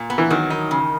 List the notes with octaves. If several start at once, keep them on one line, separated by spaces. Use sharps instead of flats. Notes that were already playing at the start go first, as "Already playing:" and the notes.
Already playing: A#2
B3
E3
D#3 F#3
D#4
C#3